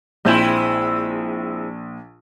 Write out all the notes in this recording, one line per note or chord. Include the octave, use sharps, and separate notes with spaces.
A#1 G#3 C4 E4 G6 E7